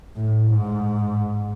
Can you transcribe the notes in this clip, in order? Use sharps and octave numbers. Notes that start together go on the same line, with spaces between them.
A2
G#2